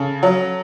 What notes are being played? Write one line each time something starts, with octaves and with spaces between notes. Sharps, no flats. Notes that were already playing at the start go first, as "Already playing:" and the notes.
Already playing: C#3 A4
F#3